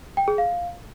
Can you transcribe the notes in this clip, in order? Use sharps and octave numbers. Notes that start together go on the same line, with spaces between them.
G5
G#4
F5